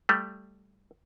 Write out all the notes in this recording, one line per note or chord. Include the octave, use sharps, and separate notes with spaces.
G3 A3